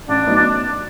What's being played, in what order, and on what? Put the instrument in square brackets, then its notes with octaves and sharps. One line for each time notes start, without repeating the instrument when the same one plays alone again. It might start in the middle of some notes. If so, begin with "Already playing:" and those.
[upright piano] A1 [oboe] D4
[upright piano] A2 F#3 B3 D#4
[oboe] D4